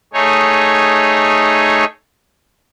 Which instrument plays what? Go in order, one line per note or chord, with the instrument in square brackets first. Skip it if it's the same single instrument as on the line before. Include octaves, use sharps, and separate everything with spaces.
[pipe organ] A3 D#4 G#4 C#5